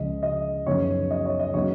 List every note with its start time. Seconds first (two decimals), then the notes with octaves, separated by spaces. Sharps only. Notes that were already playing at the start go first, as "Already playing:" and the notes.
Already playing: C#2 C#3 F3 G#3 D#5
0.23 D#5
0.66 F#2 C#3 F3 B3 D#4 C#5
1.11 D#5
1.25 C#5
1.39 D#5
1.54 C#3 F#3 B3 D#4 C#5